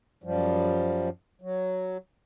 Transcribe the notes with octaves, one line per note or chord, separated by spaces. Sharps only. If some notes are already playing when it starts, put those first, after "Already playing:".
F#2 F3 G3
F#3